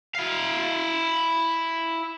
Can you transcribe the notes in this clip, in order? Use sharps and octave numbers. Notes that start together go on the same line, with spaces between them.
E4 F5